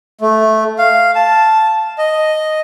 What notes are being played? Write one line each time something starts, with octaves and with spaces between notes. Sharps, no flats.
A3
F5
A5
D#5